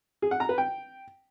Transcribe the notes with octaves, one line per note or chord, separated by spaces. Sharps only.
G#4
F#5
A#5
B4
G5